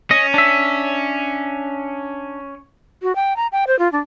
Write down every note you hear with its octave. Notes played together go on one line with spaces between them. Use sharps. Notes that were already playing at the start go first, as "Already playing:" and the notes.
C#4 D#5
D4 E5
F#4
G5
A#5
G5
C5
F4
D4